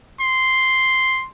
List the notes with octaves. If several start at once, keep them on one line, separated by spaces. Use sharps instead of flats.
C6